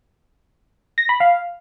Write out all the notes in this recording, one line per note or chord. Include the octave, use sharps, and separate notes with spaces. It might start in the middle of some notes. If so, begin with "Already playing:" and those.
A#6
B5
F5